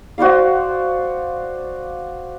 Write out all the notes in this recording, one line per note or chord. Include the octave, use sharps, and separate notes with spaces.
F#4 C5 D5 F5